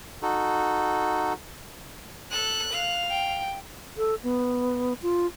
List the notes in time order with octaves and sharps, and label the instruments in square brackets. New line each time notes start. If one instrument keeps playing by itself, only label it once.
[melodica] D#4 F#4 A4
[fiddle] A4 [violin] F#6
[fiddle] F5
[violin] G5
[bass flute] A4
B3
F4